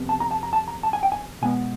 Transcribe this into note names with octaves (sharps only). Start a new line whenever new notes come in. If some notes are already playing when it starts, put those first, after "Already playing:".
Already playing: F2 C3 B3
A5
A#5
A5
A#5
A5
A#5
A5
G#5
G5
G#5
B2 G#3 B3 G#5